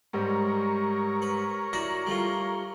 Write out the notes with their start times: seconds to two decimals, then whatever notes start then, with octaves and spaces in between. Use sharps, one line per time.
0.13 G#2 G3 A#4 C#5
1.22 B4
1.73 E4 F#4 D5 A#6
2.07 G3 A3 F4